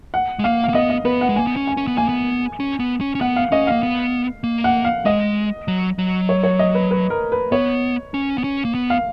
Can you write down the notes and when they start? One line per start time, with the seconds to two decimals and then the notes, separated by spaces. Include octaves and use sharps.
0.14 F#5
0.39 G#3
0.44 A#3 F5
0.64 F5
0.69 A#3
0.74 B3 D#5
0.90 D#5
1.05 B3 B4
1.21 F#5
1.29 G#3
1.36 A#3 G#5
1.47 B3
1.56 C#4
1.67 G#5
1.77 C#4
1.87 B3
1.97 A#3 G#5
2.09 B3
2.60 C#4
2.80 B3
3.01 C#4
3.15 C#4
3.21 B3 F#5
3.36 F5
3.52 C#4 D#5
3.67 A#3 F5
3.83 B3
4.44 A#3
4.64 F#5
4.84 F5
5.05 G#3 D#5
5.68 F#3
5.99 F#3
6.29 C#5
6.44 C#5
6.59 D#5
6.75 B4
6.91 B4
7.10 A#4
7.32 B4
7.52 B3 C#5
8.14 C#4
8.38 B3
8.44 C#4
8.65 A#3
8.74 B3
8.90 F5